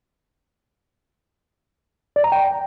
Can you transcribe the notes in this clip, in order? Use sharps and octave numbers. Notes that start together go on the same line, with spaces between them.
D5
A#5
G5